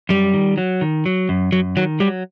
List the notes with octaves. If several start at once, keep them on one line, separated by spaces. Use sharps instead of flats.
F#2 G3
D#3
F#3
D#3
F#3
F#2
F#2 F#3
D#3 F#3
F#3 G3